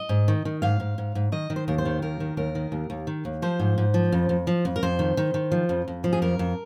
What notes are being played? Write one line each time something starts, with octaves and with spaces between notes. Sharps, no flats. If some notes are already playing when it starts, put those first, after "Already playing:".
Already playing: D#5
G#2
D#3
D#3
G#2 F5
G#2
G#2
G#2
D#3 D#5
D#3
C5
D#2 A#4
C5
D#3
D#2 A#4
D#3
D#2 A#4
D#3
D#2
D#2
D#3
D#2
F3 C5
G#2
G#2
F3
F2
F2
F3
F2
A#4
F2 C5
D#3
D#3
D#3
F3
F2
F2
F3
G#4
F2 A#4
F2